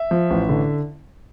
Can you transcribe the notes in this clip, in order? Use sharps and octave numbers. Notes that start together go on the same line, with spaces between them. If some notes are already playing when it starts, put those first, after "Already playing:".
Already playing: E5
F3
A1
D3